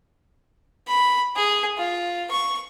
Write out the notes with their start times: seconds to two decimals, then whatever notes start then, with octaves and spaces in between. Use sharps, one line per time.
0.88 B5
1.36 G#4
1.78 F4
2.31 C#6